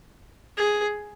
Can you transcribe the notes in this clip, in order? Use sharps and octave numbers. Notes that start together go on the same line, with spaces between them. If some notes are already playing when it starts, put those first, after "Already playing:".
G#4